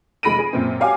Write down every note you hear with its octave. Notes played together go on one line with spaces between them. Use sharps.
F1 G#3 B5 A#6 D7 D#7
G#4
F#2 A#2 C4
F#4 G4 C#5 F5 G#5 D6